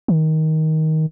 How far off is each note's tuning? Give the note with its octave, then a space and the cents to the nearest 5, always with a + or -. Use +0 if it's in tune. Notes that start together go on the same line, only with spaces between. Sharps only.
D#3 +15